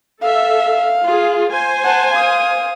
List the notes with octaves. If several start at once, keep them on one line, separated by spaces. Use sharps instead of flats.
A4 E5 F5
F4 G#4
C5 G#5
F#5 A5
F5 D#6